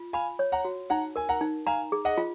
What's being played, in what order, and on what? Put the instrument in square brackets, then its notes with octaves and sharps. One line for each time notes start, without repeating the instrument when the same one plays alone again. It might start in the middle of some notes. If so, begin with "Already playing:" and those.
Already playing: [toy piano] F4
[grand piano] F5 G#5 [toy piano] B5
[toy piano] C#5
[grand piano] F#5 A#5
[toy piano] F#4
[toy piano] D#4 [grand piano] F#5 A#5
[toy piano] A#4 [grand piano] G#5
[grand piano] F#5 A#5
[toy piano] D#4
[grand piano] F5 G#5 [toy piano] A#5
[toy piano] G#4
[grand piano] D#5 F#5
[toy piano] F4